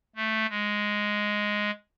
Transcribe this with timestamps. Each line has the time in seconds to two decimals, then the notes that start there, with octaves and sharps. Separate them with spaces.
0.16 A3
0.49 G#3